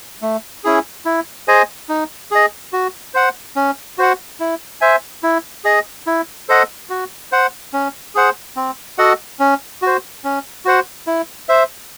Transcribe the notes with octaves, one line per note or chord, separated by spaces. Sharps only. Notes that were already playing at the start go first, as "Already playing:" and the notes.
A3
C#4 E4 G#4
E4
G#4 C5 D#5 G#5
D#4
G#4 D#5
F#4
C5 F#5
C#4
F#4 C5 F#5
E4
C5 E5 G#5
E4
G#4 D#5
E4
A4 C5 D#5 F#5
F#4
C5 F#5
C#4
G#4 C5 F#5
C4
F#4 A4 D#5 F#5
C#4
F#4 C5
C#4
F#4 C5 F#5
E4
C5 E5